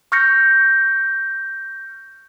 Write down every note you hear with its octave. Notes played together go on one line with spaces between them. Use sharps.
C#6 F6 G6 A#6 C#7